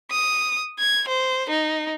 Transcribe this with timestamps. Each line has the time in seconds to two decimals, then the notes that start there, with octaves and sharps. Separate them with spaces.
0.11 D#6
0.79 G#6
1.08 C5
1.50 D#4